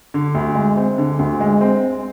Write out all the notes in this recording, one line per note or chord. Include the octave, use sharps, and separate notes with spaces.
D3
D2
G#3
C4
D3
D2
G#3
C4